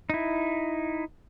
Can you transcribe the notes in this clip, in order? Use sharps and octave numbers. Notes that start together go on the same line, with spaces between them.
D#4 E4